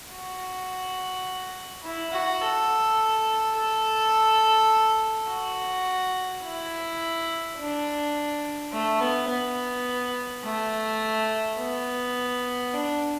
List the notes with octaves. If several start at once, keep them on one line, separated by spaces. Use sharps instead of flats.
F#4
E4
F#4
A4
A4
F#4
E4
D4
A3
B3
B3
A3
B3
D4